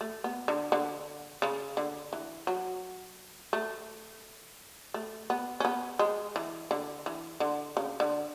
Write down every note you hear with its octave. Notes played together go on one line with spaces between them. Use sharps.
A3
B3
D3
D3
C#3
D3
E3
F#3
A3
A3
B3
C#4
B3
G#3
E3
D3
E3
D3
C#3
D3